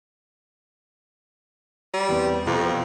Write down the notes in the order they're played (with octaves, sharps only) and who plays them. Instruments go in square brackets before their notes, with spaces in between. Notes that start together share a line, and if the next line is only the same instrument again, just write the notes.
[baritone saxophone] G3
[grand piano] E2 B3 C4
[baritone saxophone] F2 [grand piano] B2 F4